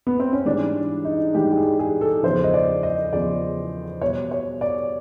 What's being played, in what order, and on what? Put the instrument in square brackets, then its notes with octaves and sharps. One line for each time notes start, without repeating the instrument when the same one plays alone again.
[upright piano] B3
C4
C#4
G#2 E3 G3 D4
D#4
G#2 E3 G3 G4
G4
G#4
G#4
A4
E2 C#3 F3 C5
D#5
D5
D#5
E2 C#3 F3 D5
B2 G3 C#5
C#5
D5